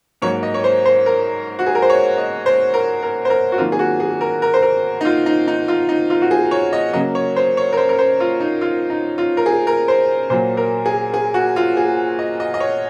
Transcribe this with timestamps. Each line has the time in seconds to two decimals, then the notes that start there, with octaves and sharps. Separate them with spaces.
0.22 G#2 F#3 A#3 C#5
0.43 D#5
0.54 C#5
0.64 C5
0.85 C5
1.06 A#4
1.59 F#4
1.66 G#4
1.75 A#4
1.82 C5
1.90 C#5
2.18 D#5
2.46 C5
2.74 A#4
3.03 A#4
3.25 C5
3.30 A#4
3.52 F#4
3.58 F2 D#3 F#3 A#3 F4
3.72 G#4
3.79 F#4
4.00 G#4
4.21 A#4
4.42 A#4
4.54 C5
4.62 A#4
5.01 D#4
5.05 F4
5.26 D#4
5.48 D#4
5.68 F4
5.89 D#4
6.10 F4
6.22 F#4
6.31 G#4
6.51 C#5
6.73 D#5
6.93 C#3 F#3 A#3 D#5
7.15 C#5
7.36 C5
7.57 C#5
7.73 A#4
7.77 C5
7.89 A#4
7.99 C5
8.20 F4
8.40 D#4
8.61 F4
8.90 D#4
9.18 F4
9.37 A#4
9.46 G#4
9.67 A#4
9.88 C5
10.30 A#2 F#3 A#3 C5
10.57 A#4
10.86 G#4
11.14 G#4
11.34 F#4
11.56 F4
11.77 G#4
12.19 D#5
12.40 D#5
12.54 D#5
12.60 C#5